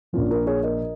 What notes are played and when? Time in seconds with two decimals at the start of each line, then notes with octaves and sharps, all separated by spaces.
0.13 A#1 A#2 F3 C#4 F4
0.30 F4 A#4
0.46 G#4 C#5
0.63 A#4 D#5